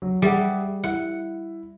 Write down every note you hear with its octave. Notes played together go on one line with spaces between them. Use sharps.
F#3
G3 G#4 E5 F#5
E4 F#5